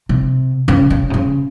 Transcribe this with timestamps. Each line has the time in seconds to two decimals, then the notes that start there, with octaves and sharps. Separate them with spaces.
0.09 C3
0.68 C#3
0.90 C#3
1.10 C3
1.14 C#3